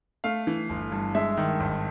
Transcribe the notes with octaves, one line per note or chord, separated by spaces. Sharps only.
A3 F5
E3
G1
G2
G#3 E5
D#3
G#1